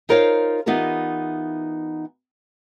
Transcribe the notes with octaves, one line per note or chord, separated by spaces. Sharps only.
D#4 F4 A#4 C5 C#5 F5
E3 B3 D#4 F4 G4 A#4